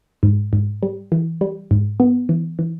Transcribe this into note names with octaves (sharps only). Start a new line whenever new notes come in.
G#2
G#2
G3
E3
G3
G#2
B3
E3
E3